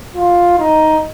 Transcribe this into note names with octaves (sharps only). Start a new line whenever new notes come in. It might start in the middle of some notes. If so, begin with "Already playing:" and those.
F4
D#4